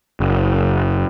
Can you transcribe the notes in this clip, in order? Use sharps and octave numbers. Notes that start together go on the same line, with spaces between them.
F#1